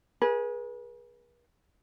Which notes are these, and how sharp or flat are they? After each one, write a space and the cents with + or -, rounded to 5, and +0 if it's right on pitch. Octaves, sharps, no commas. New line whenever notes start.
G#4 +0 B4 -40